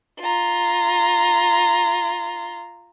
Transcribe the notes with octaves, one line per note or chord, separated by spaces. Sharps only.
F4 A#5